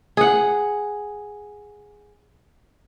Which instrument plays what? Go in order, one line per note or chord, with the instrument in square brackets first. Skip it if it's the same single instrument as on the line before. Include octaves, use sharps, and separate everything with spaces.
[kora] G#4 F#5